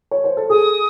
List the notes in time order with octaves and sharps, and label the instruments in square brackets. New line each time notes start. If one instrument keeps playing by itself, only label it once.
[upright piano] C#5
C5
A4
[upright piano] G#4 [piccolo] D#6